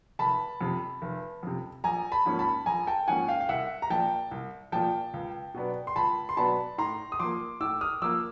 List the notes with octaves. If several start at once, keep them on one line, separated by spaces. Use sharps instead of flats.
F1 A5 B5
F2 C3
F1
F2 C3
A#1 G#5 A#5
A5 B5
G#2 F3 A#3 C#4
A5 B5
A#1 G#5 A#5
G5 A5
G#2 F3 A#3 C#4 F#5 G#5
F5 G5
F5
C2 E5 F#5
A#5
A#2 F3 G5 A5
C2
A#2 F3 G5 A5
C#2
B2 F#3 B3 D4
C6
C#2 A5 B5
C6
B2 F#3 B3 D4 A5 B5
A2 A#5 C6
D#6
F3 A#3 C6 D6
A2 D6 E6
D#6 F6
F3 A#3 D6 E6